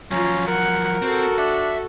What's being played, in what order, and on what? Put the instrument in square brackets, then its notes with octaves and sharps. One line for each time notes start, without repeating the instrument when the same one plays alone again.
[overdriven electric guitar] F3 F#3 [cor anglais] C#4 [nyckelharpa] F4 A#5
[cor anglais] A#4 [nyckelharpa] F#5
[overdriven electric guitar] C4 [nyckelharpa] F#4 A4
[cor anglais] D4 [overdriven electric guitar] E5